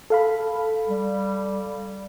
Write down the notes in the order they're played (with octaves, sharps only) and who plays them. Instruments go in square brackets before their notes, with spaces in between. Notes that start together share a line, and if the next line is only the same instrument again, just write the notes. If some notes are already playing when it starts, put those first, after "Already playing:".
[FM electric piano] A4 F5 B5
[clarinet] G3